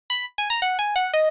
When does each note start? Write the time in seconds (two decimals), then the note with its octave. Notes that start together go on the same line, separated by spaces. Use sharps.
0.10 B5
0.38 G#5
0.50 A#5
0.62 F#5
0.79 G#5
0.96 F#5
1.13 D#5